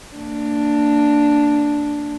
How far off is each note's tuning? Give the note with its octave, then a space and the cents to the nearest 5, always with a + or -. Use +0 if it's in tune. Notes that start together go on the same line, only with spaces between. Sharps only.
A#3 -30 D4 +0